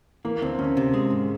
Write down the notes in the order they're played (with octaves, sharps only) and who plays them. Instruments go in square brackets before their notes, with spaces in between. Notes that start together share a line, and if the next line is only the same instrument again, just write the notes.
[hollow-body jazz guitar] E3 [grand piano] A#3
[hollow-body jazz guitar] D2 [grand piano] C4
[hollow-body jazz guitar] D2 [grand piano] C#4
[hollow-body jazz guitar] C3
G#3
G#2